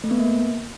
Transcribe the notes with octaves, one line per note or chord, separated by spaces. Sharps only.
A3
B3
A#3